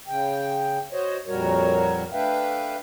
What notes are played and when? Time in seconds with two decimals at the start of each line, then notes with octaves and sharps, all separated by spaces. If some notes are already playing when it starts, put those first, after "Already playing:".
0.07 C#3 G5
0.92 F#4 C5 C#5 D#5
1.27 F2 A#2 G3 F#4 A#4 C#5
2.13 A3 D4 B4 E5 F5 G5